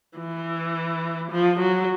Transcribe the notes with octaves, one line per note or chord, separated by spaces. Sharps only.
E3
F3
F#3